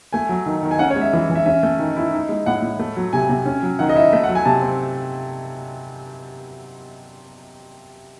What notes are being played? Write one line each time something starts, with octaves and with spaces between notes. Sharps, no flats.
A3 G#5
F#3
D#3
D#3
G#5
C#4 F#5
C#5
G#3
E5
E3
E3
E5
C#4 E5
A3
D#3
E4
D#4
G#3
A2 F#5
A2
A3
F#3
C3 G#5
C3
C#4
F#3
D#3 F#5
D#5
E4 E5
A3 E5
F#5
F#3
G#5
C3 A5
C4